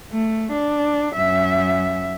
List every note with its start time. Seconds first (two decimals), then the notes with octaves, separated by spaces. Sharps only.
0.12 A3
0.52 D4
1.15 F#2 E5